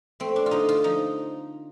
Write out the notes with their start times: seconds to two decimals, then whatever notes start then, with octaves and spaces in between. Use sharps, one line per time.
0.20 A3 C4
0.36 D4
0.46 F4
0.51 D3 D#4
0.69 F4
0.84 F3 D#4